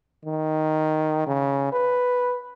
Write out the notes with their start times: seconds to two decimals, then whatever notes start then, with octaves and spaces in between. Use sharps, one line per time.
0.25 D#3
1.27 C#3
1.73 B4